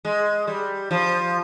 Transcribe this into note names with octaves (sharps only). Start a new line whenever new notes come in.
G#3
G3
F3